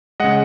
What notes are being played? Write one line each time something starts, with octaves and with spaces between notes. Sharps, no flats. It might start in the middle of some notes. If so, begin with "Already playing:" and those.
C#3 G#3 D#5 F#5